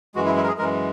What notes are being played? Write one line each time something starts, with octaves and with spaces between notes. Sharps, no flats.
F#2 E3 G#3 F#4
E4
E4
A#4
G#4
F#2 E3 G#3 A#4